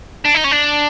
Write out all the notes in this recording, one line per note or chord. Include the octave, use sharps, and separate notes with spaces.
D4
D#4
C#4
D4